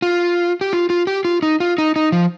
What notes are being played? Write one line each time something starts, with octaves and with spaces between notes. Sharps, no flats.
F4
G4
F4
F4
G4
F4
D#4
F4
D#4
D#4
F3